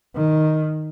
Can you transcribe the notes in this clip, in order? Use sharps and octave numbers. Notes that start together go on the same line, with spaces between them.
D#3